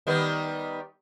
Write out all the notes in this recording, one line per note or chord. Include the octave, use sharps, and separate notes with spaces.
D#3 G3 B3